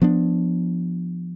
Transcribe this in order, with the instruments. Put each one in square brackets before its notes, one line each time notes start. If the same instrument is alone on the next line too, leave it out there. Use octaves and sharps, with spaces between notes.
[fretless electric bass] F3 B3 D4